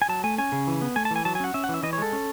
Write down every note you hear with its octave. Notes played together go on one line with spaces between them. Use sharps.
G#5
F#3 A5
A3 G#5
C#4 G#5
C#3
E3
B3
A3 G#5
A5
E3 G#5
F#3 A5
G#5
C#4 F#5
C#4 E5
F#5
E3
E5
E3 D#5
C#5
G#3 A4
C#4